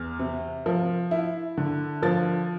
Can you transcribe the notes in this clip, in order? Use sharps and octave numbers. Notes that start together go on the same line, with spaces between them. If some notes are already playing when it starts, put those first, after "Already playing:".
Already playing: E2 F6
C3
F3
E4
D3
F3 A6